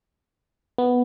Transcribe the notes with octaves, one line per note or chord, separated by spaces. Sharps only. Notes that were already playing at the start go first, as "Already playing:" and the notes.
B3